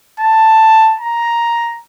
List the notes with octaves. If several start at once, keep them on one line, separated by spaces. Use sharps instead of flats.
A5
A#5